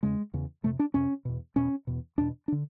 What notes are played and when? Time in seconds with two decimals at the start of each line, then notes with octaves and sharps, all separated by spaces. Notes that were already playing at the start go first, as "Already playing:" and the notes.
0.03 E2 C#3 G#3
0.34 E2 C#3
0.63 F2 C3 A3
0.79 D4
0.94 F2 C3 C#4
1.25 E2 B2
1.56 E2 B2 C#4
1.87 E2 B2
2.18 E2 B2 D4
2.48 D4
2.52 D3